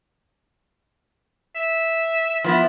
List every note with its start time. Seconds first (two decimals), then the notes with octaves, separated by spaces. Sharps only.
1.56 E5
2.44 F3 B3 E4